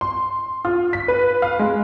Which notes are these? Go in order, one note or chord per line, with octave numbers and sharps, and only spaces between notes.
C6
F4
B6
B4
F5
G#3